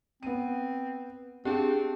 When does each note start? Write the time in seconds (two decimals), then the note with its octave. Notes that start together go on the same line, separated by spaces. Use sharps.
0.23 B3 C4 D#7
1.45 C4 D4 G4 G#4